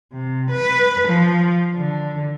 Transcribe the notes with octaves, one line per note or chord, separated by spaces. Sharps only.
C3
B4
F3
D3